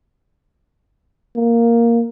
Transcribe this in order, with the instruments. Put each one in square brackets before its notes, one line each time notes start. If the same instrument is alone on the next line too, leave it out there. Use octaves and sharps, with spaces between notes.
[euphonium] A#3